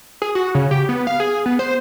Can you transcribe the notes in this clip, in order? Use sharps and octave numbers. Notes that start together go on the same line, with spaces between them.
G#4
F#4
C#3
G4
B3
F5
G#4
B3
C5